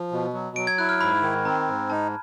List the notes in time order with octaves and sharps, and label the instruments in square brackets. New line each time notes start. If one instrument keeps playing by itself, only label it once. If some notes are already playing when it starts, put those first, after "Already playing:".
Already playing: [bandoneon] F3
B2
F#3
[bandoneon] F#3 [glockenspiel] D7
[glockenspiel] G#6
[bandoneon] E4 [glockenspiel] F#6
[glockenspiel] F6
[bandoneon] G#2 [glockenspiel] B5
[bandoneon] D#3
[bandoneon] C4 [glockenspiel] A#5
[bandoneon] G#2
[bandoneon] D#4 [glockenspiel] A5